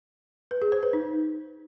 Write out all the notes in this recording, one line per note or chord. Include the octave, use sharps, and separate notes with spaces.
B4
G#4
C5
B4
D#4